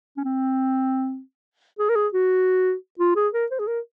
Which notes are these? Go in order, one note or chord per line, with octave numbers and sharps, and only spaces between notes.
C#4
C4
G#4
A#4
G#4
F#4
F4
G#4
A#4
C5
G#4
A#4